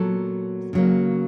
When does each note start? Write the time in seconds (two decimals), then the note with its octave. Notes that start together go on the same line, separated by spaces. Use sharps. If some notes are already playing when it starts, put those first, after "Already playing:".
Already playing: A#2 F#3 B3 A4
0.73 C#3 F#3 A#3